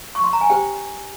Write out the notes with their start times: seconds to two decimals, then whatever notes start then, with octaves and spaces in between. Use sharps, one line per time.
0.15 C#6
0.24 C6
0.33 A#5
0.41 G#5
0.50 G4 C5 G5